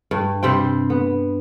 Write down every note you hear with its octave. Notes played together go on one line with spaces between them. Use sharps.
G2
C3 G3 C5 G5
B3